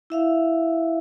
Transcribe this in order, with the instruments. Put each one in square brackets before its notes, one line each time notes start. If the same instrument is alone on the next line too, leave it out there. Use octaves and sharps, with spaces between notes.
[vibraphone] E4 E5 F5